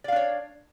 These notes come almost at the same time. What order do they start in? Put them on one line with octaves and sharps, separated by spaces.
D5 F5 D4 C#5